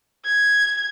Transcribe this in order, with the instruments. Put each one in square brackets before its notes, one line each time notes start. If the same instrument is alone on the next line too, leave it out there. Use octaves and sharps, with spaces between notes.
[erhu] G#6